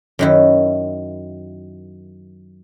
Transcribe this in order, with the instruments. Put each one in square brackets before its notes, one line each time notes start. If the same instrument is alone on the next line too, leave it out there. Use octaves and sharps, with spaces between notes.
[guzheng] F#2 D#3 E4